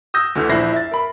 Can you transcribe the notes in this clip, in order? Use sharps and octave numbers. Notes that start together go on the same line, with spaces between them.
D#6 E6 G6 A#6
D2 D3 E3 F6 G6
A#1 E4 C5 A#6 C7
E5 A6
A#4 B5